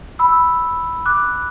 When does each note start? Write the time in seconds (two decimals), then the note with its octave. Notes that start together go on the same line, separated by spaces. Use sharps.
0.19 B5 E6
1.06 D6 F#6